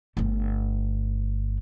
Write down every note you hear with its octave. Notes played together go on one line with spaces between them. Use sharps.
G1 A3